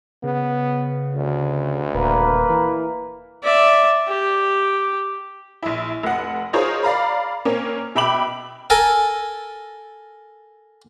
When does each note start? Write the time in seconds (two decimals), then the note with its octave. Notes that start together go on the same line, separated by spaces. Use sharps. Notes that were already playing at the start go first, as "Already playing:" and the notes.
0.23 C#3 B3
1.15 D2
1.95 D#1 A#3 B4
2.50 E3
3.43 D5 E5
4.08 G4
5.62 A#1 E4
6.03 F1 F#5
6.53 D#4 F4 G#4 A#4 C5 C#5
6.83 D5 F5 A#5 B5
7.45 A#3 C4 C#4 A#4
7.95 B2 E5 G5 B5 D6 F#7
8.70 A4 A#4 G#5